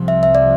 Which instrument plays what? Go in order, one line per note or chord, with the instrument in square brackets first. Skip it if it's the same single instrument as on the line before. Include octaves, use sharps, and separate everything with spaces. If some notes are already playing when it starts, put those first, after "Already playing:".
Already playing: [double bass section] C2 C3 F3
[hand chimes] E5
E5
D5